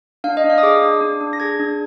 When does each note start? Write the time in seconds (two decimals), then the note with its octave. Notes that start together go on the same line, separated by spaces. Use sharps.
0.24 D4 F5
0.37 D#5
0.44 D4
0.50 F5
0.58 D#6
0.63 G#4 D6
0.82 D4
1.01 D4
1.21 D4
1.33 A#6
1.40 G#4 G#6
1.59 D4